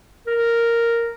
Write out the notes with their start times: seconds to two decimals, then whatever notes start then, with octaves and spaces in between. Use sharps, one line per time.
0.27 A#4